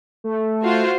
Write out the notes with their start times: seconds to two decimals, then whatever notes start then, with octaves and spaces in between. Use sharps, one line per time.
0.24 A3
0.62 F4 F#4 C5